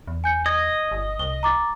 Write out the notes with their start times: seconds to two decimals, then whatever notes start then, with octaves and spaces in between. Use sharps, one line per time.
0.07 E2
0.24 G#5 G6 C#7
0.46 D#5 G#6
0.91 G1
1.19 C2 G7
1.43 A#5 D6 A6